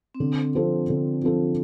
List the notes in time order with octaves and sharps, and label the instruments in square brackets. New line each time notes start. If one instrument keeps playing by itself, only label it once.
[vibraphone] C4
[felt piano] D3 [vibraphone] D4
[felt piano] F3 C4 A4 C5
D3
F3 C4 A4 C5